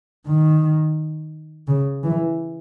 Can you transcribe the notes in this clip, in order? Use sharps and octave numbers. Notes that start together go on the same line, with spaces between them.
D#3
C#3
E3